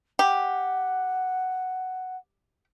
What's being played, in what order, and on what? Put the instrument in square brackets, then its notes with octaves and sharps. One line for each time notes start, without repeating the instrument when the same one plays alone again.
[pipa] G4 [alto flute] F#5